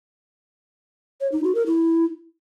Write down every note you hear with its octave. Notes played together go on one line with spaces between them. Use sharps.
C#5
D#4
F#4
A#4
E4